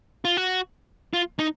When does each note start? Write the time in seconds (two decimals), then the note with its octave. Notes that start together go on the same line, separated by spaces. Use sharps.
0.25 F4
0.37 F#4
1.13 F4
1.39 D#4